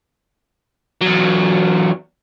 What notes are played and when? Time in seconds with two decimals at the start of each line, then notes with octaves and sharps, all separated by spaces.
1.01 E2 F#3